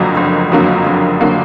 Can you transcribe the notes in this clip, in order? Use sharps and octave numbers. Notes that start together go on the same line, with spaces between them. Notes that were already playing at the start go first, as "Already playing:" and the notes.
Already playing: F#1 F2 D3 F#3 A#3
F#1
F2 D3 F#3 A#3
F#1
D3 F#3 A#3